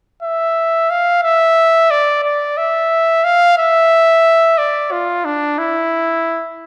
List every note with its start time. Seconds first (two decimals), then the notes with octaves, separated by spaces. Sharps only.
0.23 E5
0.90 F5
1.23 E5
1.91 D5
2.24 D5
2.57 E5
3.24 F5
3.58 E5
4.58 D5
4.92 F4
5.25 D4
5.58 E4